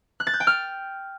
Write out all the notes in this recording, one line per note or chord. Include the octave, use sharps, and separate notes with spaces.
F#6
A6
G6
G5
F6